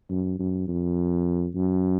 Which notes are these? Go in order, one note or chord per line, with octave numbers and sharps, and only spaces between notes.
F#2
F#2
F2
F#2